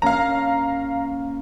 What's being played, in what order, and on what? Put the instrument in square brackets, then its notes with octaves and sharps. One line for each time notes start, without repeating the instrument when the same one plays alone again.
[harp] A#3 C#4 [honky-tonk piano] F5 A#5